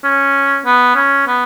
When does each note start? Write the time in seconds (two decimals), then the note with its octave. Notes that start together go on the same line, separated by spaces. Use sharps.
0.04 C#4
0.66 B3
0.95 C#4
1.27 B3